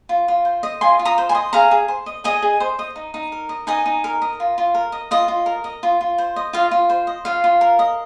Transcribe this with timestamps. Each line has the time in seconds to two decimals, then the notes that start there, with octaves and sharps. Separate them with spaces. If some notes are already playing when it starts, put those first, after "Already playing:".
0.09 F4
0.28 F4
0.45 C5
0.63 D#5
0.81 F4 G#5 C6
0.99 F4
1.05 A#5 D#6
1.18 C5
1.29 G#5 C6
1.35 D#5
1.53 G#4 F5 A#5
1.71 G#4
1.88 C5
2.06 D#5
2.24 G#4 D#5 G#5
2.42 G#4
2.60 C5
2.79 D#5
2.96 D#4
3.14 D#4
3.32 A#4
3.49 D#5
3.67 D#4 D#5 G#5
3.86 D#4
4.04 A#4
4.22 D#5
4.40 F4
4.58 F4
4.74 A#4
4.92 D#5
5.11 F4 D#5
5.28 F4
5.46 A#4
5.64 D#5
5.83 F4
6.01 F4
6.18 C5
6.36 D#5
6.53 F4 F5
6.71 F4
6.89 C5
7.07 D#5
7.25 F4 F5
7.44 F4
7.61 A#4
7.79 D#5